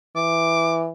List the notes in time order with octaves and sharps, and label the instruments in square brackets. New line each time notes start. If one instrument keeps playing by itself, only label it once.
[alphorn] E3 [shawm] D6